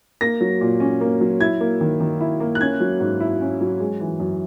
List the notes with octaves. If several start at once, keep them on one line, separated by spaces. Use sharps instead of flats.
A#3 A#6
F#3
A#2
C#4
A#3
F#3
E4 G#6
A#3
D#3
D#3
E4
A#3
F#6
C#4 G#6
F#3
G#2
E4
C#4
F#3
G#3
E3
F#2